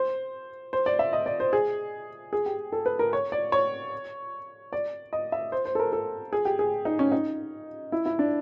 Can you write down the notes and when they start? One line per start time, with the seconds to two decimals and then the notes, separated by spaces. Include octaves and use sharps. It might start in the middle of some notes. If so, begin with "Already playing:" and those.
Already playing: C5
0.73 C5
0.86 D5
0.99 E5
1.13 D#5
1.26 D5
1.40 C5
1.53 G#4
2.33 G#4
2.46 G4
2.72 A4
2.86 B4
2.99 A#4
3.13 C#5
3.32 D5
3.52 C#5
4.73 D5
5.13 D#5
5.32 E5
5.52 C5
5.65 C5
5.75 A4
5.79 A#4
5.93 A4
6.33 G#4
6.45 G4
6.59 G#4
6.85 D#4
6.99 C#4
7.12 D#4
7.92 E4
8.06 E4
8.19 D4